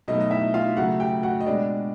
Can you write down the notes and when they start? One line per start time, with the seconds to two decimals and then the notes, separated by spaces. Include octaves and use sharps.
0.08 B2 F#3 A3 D#4 D#5
0.21 D#5
0.31 E4 E5
0.54 F4 F5
0.76 C#3 F#3 A3 F#4 F#5
1.00 G4 G5
1.23 F#4 F#5
1.40 D#5
1.46 B2 G#3 D4 D5